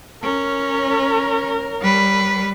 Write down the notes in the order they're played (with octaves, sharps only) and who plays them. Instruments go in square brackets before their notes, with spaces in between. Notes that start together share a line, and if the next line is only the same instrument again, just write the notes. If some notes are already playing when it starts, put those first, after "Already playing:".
[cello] C#4 [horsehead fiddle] A#4 C#5
[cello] G3 B4